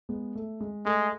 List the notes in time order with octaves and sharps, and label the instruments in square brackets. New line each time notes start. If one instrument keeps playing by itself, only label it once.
[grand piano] G#3 B3
A3
G#3
[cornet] G#3 [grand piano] A3